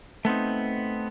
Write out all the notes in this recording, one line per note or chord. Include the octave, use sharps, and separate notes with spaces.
A3 B3 C4 D#4